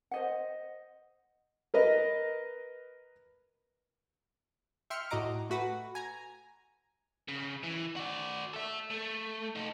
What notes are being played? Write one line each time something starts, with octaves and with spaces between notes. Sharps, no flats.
C5 D#5 F#5
A#4 B4 D#5
E5 G5 C6 F6 C#7
A2 F#4 D#5 A#5 D6
A3 F#4 B4 F#5
G#5 A#5
C#3
E3
F#4 D5
A4 E5
A3
D#4 A4